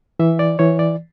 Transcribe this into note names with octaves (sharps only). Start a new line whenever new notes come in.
E3 E5
D5
E3 C#5
D5